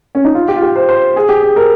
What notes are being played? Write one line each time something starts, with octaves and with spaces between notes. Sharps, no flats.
C#4
D#4
F4
G4
F4
G4
C5
C5
G#4
G4
G#4
A#4